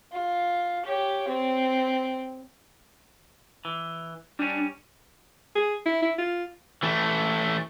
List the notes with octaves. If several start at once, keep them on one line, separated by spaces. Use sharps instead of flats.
F4
G4 C#5
C4
E3
G3 C#4 D4
G#4
E4
E4
F4
E3 A3